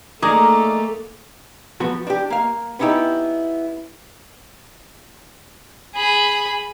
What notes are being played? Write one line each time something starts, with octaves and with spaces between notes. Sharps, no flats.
A3 A#3 D#4 G#4 A#4 D5 A#5
F3 B3 F#4
D4 G4
A#3 F5
B3 C#4 D#4 E4 G4
G#4 B5